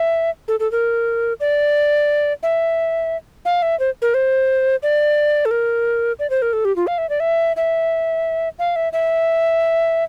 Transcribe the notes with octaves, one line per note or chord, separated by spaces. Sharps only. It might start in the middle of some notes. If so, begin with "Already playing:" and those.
Already playing: E5
A4
A4
A#4
D5
E5
F5
E5
C5
A#4
C5
D5
A4
A#4
D5
C5
A#4
A4
G4
F4
F5
E5
D5
E5
E5
F5
E5
E5